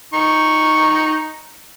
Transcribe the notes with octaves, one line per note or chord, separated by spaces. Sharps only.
D#4 C#6